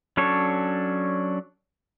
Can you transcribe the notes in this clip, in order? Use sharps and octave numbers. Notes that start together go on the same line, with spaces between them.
F#3 C#4 D4 A4 C#5